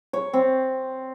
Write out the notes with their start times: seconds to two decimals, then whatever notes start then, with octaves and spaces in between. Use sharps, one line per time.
0.13 C#5
0.33 C4